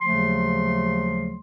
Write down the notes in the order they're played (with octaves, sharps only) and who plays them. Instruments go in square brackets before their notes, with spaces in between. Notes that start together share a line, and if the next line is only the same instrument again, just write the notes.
[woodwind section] D#2 C#3 F3 F#3 A3 C6